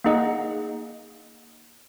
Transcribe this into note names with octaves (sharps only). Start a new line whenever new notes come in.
A#3 D#4 G#4 D#5 F#5